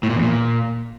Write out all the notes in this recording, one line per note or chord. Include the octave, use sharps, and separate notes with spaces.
A2
A#2
E2
A#2